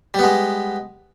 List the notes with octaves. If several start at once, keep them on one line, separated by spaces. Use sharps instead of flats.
G3 G#3 B3